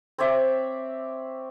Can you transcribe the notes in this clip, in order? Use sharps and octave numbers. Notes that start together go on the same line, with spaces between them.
C4 C#5 D5 E5